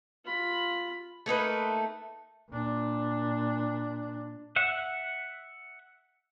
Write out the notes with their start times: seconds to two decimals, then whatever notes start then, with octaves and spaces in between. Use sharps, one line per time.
0.25 F4 B5
1.26 A3 A#3 D#4 B4
2.50 A#2 D4
4.56 E5 F#5